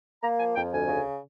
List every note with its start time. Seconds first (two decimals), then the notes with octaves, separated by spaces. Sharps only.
0.22 A#3 A#5
0.39 F3 G#5
0.56 F2 G5
0.72 D2 G#5
0.88 C#3